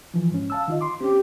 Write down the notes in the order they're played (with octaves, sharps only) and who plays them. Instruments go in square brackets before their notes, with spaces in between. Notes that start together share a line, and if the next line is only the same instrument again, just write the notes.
[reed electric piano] E3 F3
G#2 C#4
F5 A5 E6
D#3 F4 D#5
C6 D6
[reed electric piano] C4 C#4 [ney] G4